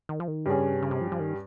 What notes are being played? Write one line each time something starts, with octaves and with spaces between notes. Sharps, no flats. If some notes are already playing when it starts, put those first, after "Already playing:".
D#3
F3
D#3
G2 C#3 G3 C#4 G#4
C3
C#3
C3
F3
F3
D#3